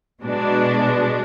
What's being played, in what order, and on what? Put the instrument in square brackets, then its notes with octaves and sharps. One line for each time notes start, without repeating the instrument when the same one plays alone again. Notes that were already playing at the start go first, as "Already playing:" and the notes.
[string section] B2 G#3 D4